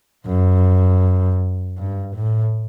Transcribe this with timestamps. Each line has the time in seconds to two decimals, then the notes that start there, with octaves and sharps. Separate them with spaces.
0.26 F#2
1.77 G2
2.15 A2